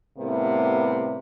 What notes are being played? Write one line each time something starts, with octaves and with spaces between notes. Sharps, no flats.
A2 C3 G3 A#3 B3